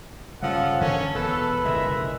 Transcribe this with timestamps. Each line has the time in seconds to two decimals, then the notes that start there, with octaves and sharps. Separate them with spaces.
0.42 G2 C#3 F3 A4 F#5
0.81 D3 E3 A#3 C#4 A#4 A5
1.15 E1 B3 A4 B4
1.64 F#1 B1 D3 F3 G#3 E5